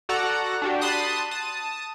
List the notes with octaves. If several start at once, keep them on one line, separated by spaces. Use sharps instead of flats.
F#4 A4 D5 F#5 A#5
D4 F#4 G4
A5 B5 C6 D#6 F#6
A5 D#6